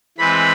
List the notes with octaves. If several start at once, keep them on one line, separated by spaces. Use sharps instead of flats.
E3 G#3 C4 B4 B5